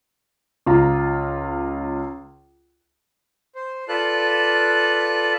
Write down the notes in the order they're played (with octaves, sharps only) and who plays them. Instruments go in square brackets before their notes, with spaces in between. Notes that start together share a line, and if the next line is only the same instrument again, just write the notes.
[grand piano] C#2 F4 A#5
[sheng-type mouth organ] C5
F4 A4 B4 D5 A5 F#6